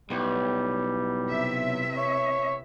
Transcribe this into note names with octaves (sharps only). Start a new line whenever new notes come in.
B1 A2 G3 B3 G5
C3 E5
C#5